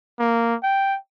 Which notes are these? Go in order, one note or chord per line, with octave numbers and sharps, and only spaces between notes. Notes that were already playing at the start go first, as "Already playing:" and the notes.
A#3
G5